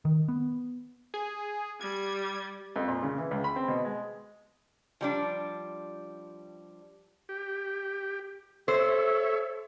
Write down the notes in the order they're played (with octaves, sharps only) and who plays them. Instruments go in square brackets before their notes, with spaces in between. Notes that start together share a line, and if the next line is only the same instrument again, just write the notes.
[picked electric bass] D#3
B3
[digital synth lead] G#4
[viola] G3 [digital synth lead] G#6
[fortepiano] F2
A#2
C#3
E3
C#2
B5
C4
B2
G#3
[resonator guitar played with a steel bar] F3 G3 D4
[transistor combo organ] G4
[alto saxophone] A4 [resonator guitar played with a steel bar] C5 [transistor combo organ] C#5 E5